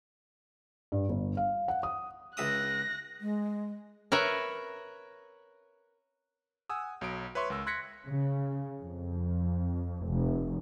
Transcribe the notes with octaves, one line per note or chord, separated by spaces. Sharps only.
G2
G1
F5
F#5
D#6
C#2 E5 D#6 F#6 A#6
G#3
A#4 B4 C#5 E5
F#5 G#5 D#6 E6
B1 F#3 D#6 D7
B4 C#5 E5 C6 C#6
C#2 A#4 E6
C6 F#6 G#6 A#6 B6 C#7
C#3
F2
F1